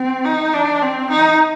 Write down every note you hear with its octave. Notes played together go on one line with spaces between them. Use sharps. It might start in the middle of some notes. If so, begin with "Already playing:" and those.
Already playing: C4
D#4
D4
C4
D#4